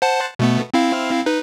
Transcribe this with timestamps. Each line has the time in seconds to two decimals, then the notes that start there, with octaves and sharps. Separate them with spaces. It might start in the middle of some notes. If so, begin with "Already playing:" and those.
0.02 C5 F#5 A5
0.39 B2 A3 B3
0.74 C4 E4 F5
1.26 D#4 B4